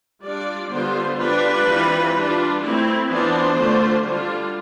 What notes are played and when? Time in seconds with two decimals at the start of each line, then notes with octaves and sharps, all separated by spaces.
0.22 G3 D4 F4 D5
0.70 D3 G3 B3 F4 C5
1.18 G3 D4 F4 B4
1.66 E3 G3 C4 F4
2.14 G3 D4 F4
2.62 A3 C4 E4
3.09 E3 B3 D4 F4 C5
3.58 D3 A3 D4 F4
4.06 D3 G3 D4 F4